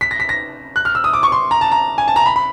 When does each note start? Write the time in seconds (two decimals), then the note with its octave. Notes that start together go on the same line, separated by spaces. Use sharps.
0.01 B6
0.11 A#6
0.20 B6
0.29 A#6
0.76 F#6
0.85 F6
0.95 E6
1.04 D#6
1.13 D6
1.23 C#6
1.32 C6
1.51 A#5
1.61 A5
1.72 A#5
1.98 G#5
2.08 A5
2.16 A#5
2.26 B5
2.36 B5